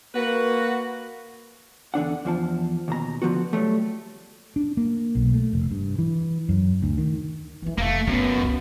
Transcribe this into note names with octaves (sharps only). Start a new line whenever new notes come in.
A#3 F#4 B4
E2 D3 D4 F#5
E2 F3 A5
D#2 B2 A#5
D3 F3 B3 F#4
F#3 G3 A3
D4
A#3
B1
A3
F1
G2
E3
F#2
D2
D#3
E3 F3 G#3
F1 A3 A#3 F5
F#2 D3 B3
F1 C#2